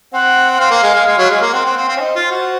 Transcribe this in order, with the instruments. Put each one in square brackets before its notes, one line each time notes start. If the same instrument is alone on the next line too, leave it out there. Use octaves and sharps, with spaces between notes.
[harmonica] C4 [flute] F#5
[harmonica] C4 [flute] F5
[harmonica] A#3
G#3
G#3
G#3
F#3
G#3
A#3
[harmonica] C4 [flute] F#5
[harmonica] C4 [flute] F#5
[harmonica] C4 [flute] F5
[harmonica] C4 [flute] F5
[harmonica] C#4
[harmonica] D#4 [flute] C5
[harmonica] F4
F#4